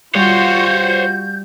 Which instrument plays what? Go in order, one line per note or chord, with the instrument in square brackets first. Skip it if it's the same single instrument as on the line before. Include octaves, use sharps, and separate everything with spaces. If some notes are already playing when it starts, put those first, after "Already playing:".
[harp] G3 [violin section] F4 F#4 [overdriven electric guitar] C5 C#5 [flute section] G6